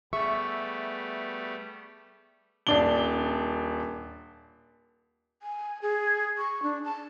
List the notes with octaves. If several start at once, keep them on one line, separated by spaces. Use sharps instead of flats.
G3 A3 B3 G#4 E5 C#6
D#1 D4 G7
G#5
G#4
C#6
D4
A5